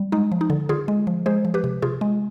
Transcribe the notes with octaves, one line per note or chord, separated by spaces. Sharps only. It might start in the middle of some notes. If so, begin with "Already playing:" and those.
Already playing: G3
G#3 D#4
F3
D#4
D3
D3 F4 G#4
G#3
F3
G#3 G#4 C5
F3
G4 B4
C3
C3 F4 G#4
G#3